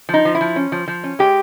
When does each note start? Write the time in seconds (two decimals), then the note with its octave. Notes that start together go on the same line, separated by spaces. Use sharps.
0.09 F3 D#4
0.25 F3
0.35 E4
0.41 F3
0.56 C#4
0.72 F3
0.88 F3
1.04 C#4
1.19 G#3 G4